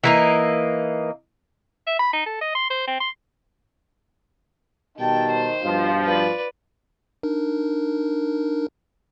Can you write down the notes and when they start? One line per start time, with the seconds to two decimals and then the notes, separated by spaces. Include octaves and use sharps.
0.04 E3 A#3 D#4
1.87 E5
1.99 B5
2.13 D#4
2.26 A4
2.41 D#5
2.55 C6
2.70 C5
2.87 C4
3.00 C6
4.99 B2 D#3 G3 G5 A5
5.31 C5
5.64 G2 B2 F3 F4
6.05 B4 D5
7.23 D4 D#4 A#4